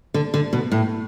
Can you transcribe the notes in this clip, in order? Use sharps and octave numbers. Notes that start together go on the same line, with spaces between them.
D3
D3
B2
A2